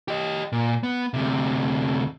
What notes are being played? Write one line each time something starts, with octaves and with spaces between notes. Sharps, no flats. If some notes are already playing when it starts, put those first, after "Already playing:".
G4 D#5
A#2
B3
D2 C3